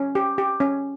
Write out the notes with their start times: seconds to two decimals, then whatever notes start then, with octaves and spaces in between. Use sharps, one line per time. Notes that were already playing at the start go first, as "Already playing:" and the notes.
Already playing: C#4
0.15 G4
0.38 G4
0.60 C#4